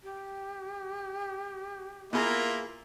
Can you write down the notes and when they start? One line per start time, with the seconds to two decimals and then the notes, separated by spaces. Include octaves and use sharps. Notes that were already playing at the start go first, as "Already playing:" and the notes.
0.03 G4
2.13 A#3 B3 E4 F4 G#4 A#4